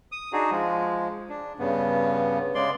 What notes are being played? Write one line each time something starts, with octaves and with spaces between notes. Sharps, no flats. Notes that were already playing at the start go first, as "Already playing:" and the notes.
D#6
D4 D#4 F#4 G#4
F3 G#3
D4
G2 C#3 B3
C#3 G#3 D5 C6